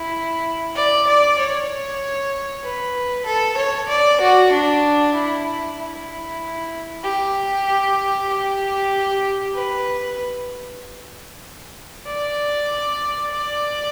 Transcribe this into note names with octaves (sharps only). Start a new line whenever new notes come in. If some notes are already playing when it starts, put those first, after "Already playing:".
Already playing: E4
D5
D5
C#5
B4
A4
C#5
D5
F#4
D4
E4
E4
G4
G4
B4
D5
D5